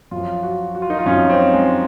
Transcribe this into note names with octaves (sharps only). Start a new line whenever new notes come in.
F#2 F3 F4
F#4
F#4
F4
D#4
F4
F#2 F3 C#4
C4
G#3